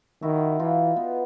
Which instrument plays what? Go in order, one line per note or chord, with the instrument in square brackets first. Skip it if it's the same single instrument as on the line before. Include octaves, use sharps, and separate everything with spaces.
[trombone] D#3 [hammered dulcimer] E4 F#4
[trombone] E3 [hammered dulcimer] D#4 F4
[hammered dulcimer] B3